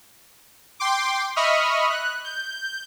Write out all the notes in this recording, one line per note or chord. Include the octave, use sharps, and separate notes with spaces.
G5 C6 D6
D#5 E5 B5 C#6 D#6 F6
F#6
G6